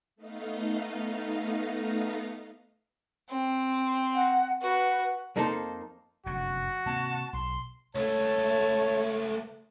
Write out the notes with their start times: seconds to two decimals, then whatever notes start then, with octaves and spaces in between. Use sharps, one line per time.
0.16 A3 B3 D#4 D#5 F5
3.30 C4
4.14 F#5
4.62 F#4 B4
5.36 F2 A#3 D#4 A4 C5
6.26 F1 F#2 D3 F#4
6.86 C3 A#3 C4 A5
7.33 B1 C6
7.95 C#2 A3 C#5 A5